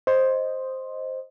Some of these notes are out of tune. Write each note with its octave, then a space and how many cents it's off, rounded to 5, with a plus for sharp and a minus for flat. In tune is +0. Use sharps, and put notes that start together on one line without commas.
C5 +5 D#5 +0